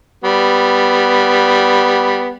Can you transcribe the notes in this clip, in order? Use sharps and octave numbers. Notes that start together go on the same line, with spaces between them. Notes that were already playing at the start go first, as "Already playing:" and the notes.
G3 B3